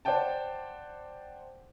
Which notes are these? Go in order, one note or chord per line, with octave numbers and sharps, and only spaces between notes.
C5 D5 F#5 G5 A5